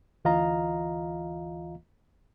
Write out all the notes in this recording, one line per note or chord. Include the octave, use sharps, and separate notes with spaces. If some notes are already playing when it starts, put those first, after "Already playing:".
D2 E3 F4 D#5 F5 A#5